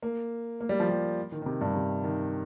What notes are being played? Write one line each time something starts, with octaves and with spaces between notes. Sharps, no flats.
A#3
A#3
G3
F3
G3
D#3
D#3
C3
G2
C3
D#3